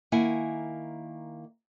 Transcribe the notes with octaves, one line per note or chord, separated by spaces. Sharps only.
D#3 A#3 E4 F#5 G#5